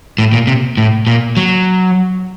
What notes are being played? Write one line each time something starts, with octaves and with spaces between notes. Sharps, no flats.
A2
A#2
C3
A2
A#2
F#3